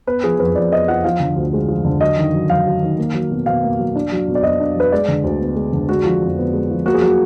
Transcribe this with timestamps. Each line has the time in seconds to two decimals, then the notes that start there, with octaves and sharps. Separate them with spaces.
0.07 B3 B4
0.24 F3 G#4
0.39 F2 B4
0.55 F2 D5
0.71 B3 D#5
0.88 F3 F#5
1.04 F3 F5
1.20 D3
1.36 D2
1.53 G#3
1.68 F3
1.84 D3
2.01 F#3 D#5
2.18 D#3
2.33 F#2
2.50 F#2 F5
2.66 F#3
2.83 D#3
2.98 A#3
3.14 F#3
3.31 B2
3.46 B2 F5
3.63 A#3
3.79 F#3
3.96 D4
4.12 F#3
4.28 B2
4.35 D5
4.43 B2 D#5
4.60 D4
4.75 F#3 B4
4.92 G#3 D5
5.08 D3
5.24 D2
5.40 B3
5.56 G#3
5.73 D3
5.89 G#3 F#4
6.04 F3
6.21 F2
6.38 B3
6.53 G#3
6.70 F3
6.86 A#3 F#4
6.94 G#4
7.02 F#3 F#4